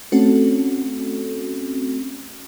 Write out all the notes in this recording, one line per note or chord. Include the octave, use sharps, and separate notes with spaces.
A3 C4 C#4 F#4 A4